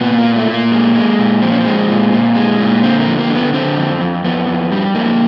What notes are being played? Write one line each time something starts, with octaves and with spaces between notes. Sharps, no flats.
A#2 B3
A#3
A#2
A3
A#2
A#3
G#3
G#3
A#2
F3 C4
C#4
C4
G#3
A#2
A#2
G#3
A#2
D3 C4
A#3
F2
A#3
D3
B3
D3 C4
F2
F2
F2 B3
F2
G3
F2 A#3